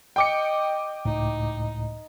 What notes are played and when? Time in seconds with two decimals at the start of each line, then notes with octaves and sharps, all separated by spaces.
0.16 D#5 G5 D6 C#7
1.05 C#2 A2 D#4